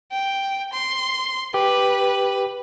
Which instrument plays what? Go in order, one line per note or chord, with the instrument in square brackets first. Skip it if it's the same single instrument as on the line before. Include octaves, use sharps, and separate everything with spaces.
[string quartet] G5
C6
[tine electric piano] G4 [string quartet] B4